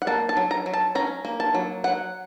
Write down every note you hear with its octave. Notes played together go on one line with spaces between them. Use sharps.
F#5
A#3 A5
A5
F#3
A#5
F#3
A5
C#4 A#5
A#3
A5
F#3
F#3 F#5